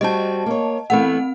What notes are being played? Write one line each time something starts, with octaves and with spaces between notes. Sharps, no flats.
G3 C4 F#4 D#5 A5
A#3 C#5
E3 A3 B3 C4 F#5